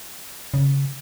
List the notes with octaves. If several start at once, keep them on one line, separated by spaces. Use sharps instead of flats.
C#3